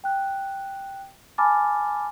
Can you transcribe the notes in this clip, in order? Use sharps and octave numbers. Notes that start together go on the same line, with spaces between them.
G5 F#6
G#5 A5 B5 D6 F6 A6